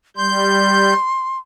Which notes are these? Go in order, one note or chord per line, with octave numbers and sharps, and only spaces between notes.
G3 C6 G6